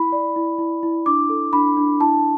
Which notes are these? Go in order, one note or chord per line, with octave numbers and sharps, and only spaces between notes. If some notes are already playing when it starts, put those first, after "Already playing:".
Already playing: E4 B5
D5
E4
E4
E4
D4 D6
A4
D4 B5
D4
E4 A5